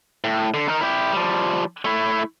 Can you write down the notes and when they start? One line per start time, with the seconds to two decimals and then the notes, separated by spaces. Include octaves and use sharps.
0.24 A2
0.54 D3
0.69 D#4 A#4
0.81 E4 G4
1.12 F3 G3
1.85 A3 E4